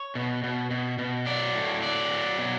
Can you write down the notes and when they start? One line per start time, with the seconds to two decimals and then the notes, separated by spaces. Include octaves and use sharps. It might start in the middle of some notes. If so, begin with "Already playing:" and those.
Already playing: C#5
0.15 B2
0.44 B2
0.71 B2
0.98 B2
1.26 F#3 D5
1.56 A2
1.83 F#3 D5
2.11 F#3
2.39 B2